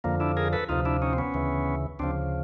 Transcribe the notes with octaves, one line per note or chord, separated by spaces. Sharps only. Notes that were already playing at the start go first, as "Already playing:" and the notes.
F2 D3 F3 A#3
D4 E4
G#4 A#4
A4 B4
D2 C3 F3 D#4 F4
D4 E4
C#4 D#4
C4
B3 C#4
D2 C#3 E3
D2 C#3 F3 C4 D4